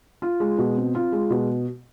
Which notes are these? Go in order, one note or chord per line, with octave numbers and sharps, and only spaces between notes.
F4
G#3
B2
C4
F4
G#3
B2